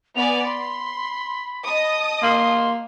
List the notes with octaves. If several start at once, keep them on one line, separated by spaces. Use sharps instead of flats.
B3 D5 G#5 F7
B5 C6
D#5 A5 D#6
A#3 C6